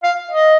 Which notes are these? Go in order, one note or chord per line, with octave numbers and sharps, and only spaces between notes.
F5
D#5